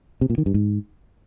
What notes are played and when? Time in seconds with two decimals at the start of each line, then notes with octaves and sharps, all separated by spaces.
0.21 C3
0.30 A#2
0.38 D#3
0.46 G2
0.54 G#2